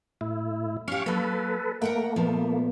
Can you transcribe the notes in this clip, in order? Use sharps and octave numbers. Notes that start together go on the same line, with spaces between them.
A2 E4
C#4 G4 F5 C#6
F#3 A#3 A4 B4
A3 A#3 A#4 F#5 G5
A#2 F3 B3